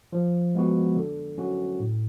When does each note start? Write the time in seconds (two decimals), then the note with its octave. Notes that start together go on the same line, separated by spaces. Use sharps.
0.13 F3
0.55 G#3 B3 F#4
0.96 D3
1.38 F#3 C#4 F#4
1.80 A2